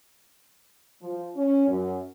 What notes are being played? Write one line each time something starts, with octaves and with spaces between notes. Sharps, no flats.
F3
C#4
F#2